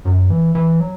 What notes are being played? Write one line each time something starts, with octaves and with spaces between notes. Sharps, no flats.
F#2
E3
E3
F#3